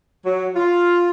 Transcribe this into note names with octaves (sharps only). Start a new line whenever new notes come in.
F#3
F4